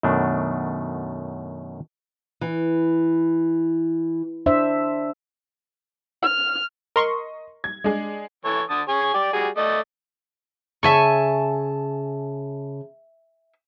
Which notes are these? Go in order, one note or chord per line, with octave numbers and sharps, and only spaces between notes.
F#2 B2 D#3 A3 D4
E3
D4 C5 E5
F6
A#4 D#5 C6 C#6
G#6
G#3 D4 G#4
E3 A4 C#5
D3 A5 D#6
G#4 C#5 G#5
G4 D5
G3 F#4 G#4
A3 D5 D#5
C#3 E5 G#5 A5 C#6